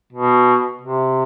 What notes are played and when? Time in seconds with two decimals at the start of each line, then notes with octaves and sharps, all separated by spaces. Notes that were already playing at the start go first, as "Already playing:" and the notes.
0.13 B2
0.81 C3